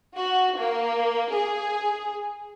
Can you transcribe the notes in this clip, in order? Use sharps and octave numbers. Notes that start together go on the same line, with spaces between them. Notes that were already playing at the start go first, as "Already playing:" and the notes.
F#4
A#3
G#4